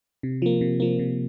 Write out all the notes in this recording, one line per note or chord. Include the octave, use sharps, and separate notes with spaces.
C3
F3 A#3
C3
F3 A#3
C3